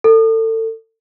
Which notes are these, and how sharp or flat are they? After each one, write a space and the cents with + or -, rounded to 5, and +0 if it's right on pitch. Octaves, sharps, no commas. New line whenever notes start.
A4 +30